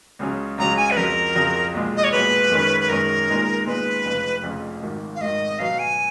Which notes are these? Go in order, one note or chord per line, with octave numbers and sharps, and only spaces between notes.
C#2 C#3 F#3 C#4
C#2 C#3 F#3 C#4 A#5
G#5
B4
F2 C#3 F#3 A#4
F2 C#3 F#3
B1 A#2 G#3
D#5
C#5
B1 A#2 G#3 B4
F#2 D#3 G#3 C#4
B4
F#2 D#3 G#3 C#4 A#4
A#2 G#3 B3 D#4
A#2 G#3 B3 D#4 B4
F1 F2 C#3
F1 F2 C#3
G#1 G#2 D#3
F5
G#1 G#2 D#3 D#5
B1 B2 F#3 B3 F5
G#5